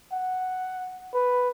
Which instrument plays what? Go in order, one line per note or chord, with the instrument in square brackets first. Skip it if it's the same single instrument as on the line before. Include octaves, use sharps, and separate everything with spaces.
[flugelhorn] F#5
B4